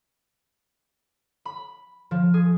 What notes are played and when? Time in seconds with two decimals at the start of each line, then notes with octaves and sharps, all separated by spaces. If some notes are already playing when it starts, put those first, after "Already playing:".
1.45 B5
2.11 F3
2.34 G#4